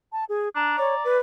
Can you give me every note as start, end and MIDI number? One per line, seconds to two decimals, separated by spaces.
0.12 0.25 81
0.29 0.49 68
0.56 0.76 62
0.56 1.03 82
0.78 0.95 73
0.78 1.17 74
1.04 1.18 71